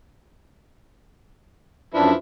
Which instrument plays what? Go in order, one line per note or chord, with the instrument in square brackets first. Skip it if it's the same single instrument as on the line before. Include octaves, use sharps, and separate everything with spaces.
[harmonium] F#2 D4 [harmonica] F3 E4 B4